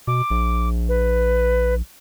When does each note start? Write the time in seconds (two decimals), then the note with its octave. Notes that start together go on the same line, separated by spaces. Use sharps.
0.07 B2 D6
0.30 A#1
0.89 B4